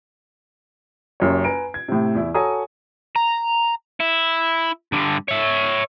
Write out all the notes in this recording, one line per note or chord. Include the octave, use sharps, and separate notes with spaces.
F#1 F#2 G4 C#5
B4 G#5 A#5 D7
G#6
A2 C3
E2 E4
F#4 A4 C#5 G#5 A#5 D#6
A#5
E4
G2 D3
C#5 E5